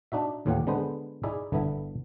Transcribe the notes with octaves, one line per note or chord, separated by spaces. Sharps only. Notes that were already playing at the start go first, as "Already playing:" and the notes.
D4 D#4 F#4 E5
D#2 A2 E3 F4 G4 F#5
D3 G#3 B3 B4 C5
D#4 E4 G#4 D5 E5
G1 D3 B3 E4 E5